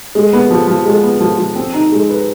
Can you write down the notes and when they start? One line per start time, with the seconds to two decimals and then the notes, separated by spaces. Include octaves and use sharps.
0.15 G#3
0.33 B3
0.51 F3
0.67 F3
0.86 G#3
1.03 B3
1.21 F3
1.38 F3
1.56 C4
1.74 D#4
1.92 G#3
2.09 B4